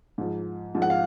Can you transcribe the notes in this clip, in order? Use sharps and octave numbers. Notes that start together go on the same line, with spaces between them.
G#2 F3
G#2 F3
F#5
F5